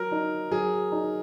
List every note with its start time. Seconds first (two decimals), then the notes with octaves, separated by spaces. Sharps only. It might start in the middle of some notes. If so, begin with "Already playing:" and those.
Already playing: F#3 A#4
0.12 D#4
0.51 F#3 G#4
0.92 D#4